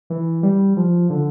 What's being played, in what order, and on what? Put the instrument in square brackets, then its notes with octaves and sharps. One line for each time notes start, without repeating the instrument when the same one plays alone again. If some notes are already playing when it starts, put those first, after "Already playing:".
[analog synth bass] E3
G3
F3
D3